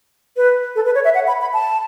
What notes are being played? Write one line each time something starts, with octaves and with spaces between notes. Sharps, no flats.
B4
A4
B4
C#5
E5
F#5
B5
B5
A5